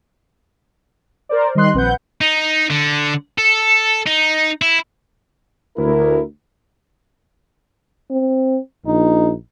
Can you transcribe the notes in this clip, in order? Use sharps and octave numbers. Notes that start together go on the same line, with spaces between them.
A#4 C5 D5
D#3 G3 D#5 C6 F#6
A#1 C4 B4 F#5 G6
D#4
D3
A4
D#4
E4
D2 E4 A#4
C4
A#1 D#4